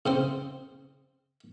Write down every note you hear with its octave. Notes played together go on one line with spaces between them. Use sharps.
C#3 C4 C5